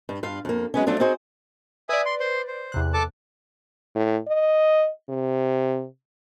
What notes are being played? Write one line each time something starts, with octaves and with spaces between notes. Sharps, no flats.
G2
G2 F4 F5
F2 A#3
F#3 G#3 B3 C#4
F3 F#3 A3 D4 F4
C4 D#4 F#4 G#4 C5
B4 D5 E5 G#5 D#6
C6
C5 C6
C5
E2 C3 F#6
A4 A5 D6
A2
D#5
C3